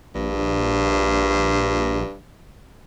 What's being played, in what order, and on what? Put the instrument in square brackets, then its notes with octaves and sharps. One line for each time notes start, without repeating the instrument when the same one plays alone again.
[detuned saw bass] A#1 [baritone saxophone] G2